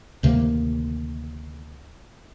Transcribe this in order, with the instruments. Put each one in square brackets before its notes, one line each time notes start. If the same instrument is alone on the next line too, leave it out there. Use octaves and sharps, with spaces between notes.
[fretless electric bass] D2 C3 D#3 A#3